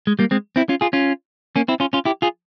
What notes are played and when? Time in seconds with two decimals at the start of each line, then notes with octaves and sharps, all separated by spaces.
0.07 G#3
0.19 G3 A#3
0.31 G#3 C4
0.56 C4 E4
0.69 C#4 F4
0.81 F4 G#4
0.93 C#4 F4
1.56 A#3 C#4
1.68 C4 E4
1.80 C#4 F4
1.93 C#4 F4
2.05 E4 G4
2.22 F4 G#4